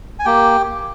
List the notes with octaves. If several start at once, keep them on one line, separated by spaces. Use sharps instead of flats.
G#5
A#3 G4 G5